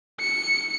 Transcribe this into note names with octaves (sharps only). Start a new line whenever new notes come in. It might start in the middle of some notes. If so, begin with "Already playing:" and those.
C#7